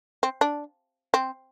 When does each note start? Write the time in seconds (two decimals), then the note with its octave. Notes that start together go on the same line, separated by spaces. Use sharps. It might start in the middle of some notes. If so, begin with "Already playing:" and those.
0.23 C4
0.41 D4
1.14 C4